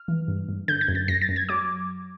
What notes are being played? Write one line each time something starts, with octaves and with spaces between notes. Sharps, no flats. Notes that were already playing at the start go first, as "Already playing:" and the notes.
Already playing: F6
E3
G2
G2
D3 G6
G#6
F#2
A6
F#2 A#6
A6
F#2
G#6
F#3 D6